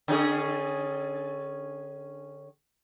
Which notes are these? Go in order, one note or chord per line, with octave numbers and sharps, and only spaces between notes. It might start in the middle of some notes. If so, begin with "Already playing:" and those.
D3 C#4 G#4